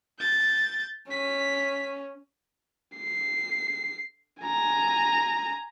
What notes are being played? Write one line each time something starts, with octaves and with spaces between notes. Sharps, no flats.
G6 A6
C#4 B6
C7
G#5 A#5